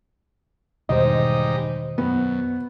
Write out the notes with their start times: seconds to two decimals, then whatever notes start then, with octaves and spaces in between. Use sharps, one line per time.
0.89 E2 G#2 B2 D#3 G3 D#4 C5 D#5
1.98 F#2 B3